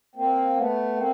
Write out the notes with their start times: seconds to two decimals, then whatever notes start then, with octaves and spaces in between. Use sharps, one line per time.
0.15 A#3 C4
0.56 A3 B3
0.96 A#3 C4